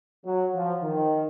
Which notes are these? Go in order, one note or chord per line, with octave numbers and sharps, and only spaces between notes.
F#3
F3
D#3